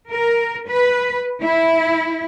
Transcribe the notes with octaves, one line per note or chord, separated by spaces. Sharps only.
A#4
B4
E4